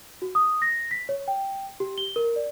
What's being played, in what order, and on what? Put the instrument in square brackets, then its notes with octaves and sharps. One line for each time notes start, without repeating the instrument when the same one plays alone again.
[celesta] F#4
D#6
A#6
B6
C#5
G5
G4
G7
A#4
D5